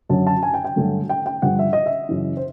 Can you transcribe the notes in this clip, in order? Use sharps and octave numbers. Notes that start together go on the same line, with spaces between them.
F#2 D3 F#3 A5
A5
G#5
G5
G5
G2 D3 F#3 A3
G5
G5
G2 D3 F3 F#5
E5
D#5
E5
F#2 C#3 E3
C5